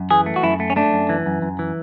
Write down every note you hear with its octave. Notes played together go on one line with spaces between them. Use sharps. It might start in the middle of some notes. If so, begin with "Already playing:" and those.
Already playing: F#2
E3 G#4
A3
F#4
F#2 E4
A3
C#4
A3 D4
F#2
E3
F#2
F#2
E3